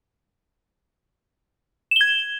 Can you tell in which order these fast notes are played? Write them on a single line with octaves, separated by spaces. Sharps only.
E7 G7 G#6